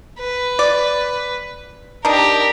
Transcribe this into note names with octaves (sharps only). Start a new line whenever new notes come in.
B4
D5
D4 D#4 G4 A#4